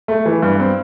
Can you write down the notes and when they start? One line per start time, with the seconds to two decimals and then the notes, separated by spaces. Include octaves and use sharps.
0.08 A3
0.26 E3
0.43 G2
0.60 C4